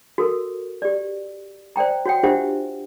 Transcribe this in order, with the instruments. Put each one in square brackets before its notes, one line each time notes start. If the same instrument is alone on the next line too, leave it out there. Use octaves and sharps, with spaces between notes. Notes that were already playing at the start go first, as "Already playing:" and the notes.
[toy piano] F#4 A4 A#4
G4 D5
C5 D5 G5 A#5
F#4 C#5 F#5 G5
D4 F4 G4 C5 E5 F#5